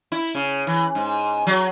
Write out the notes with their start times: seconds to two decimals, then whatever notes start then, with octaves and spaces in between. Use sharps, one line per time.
0.12 E4
0.35 C#3
0.67 E3
0.95 G#2
1.47 F#3